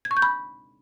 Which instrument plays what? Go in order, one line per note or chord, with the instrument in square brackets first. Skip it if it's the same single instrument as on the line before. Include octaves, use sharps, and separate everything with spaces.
[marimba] G#6
C#6
G6
B5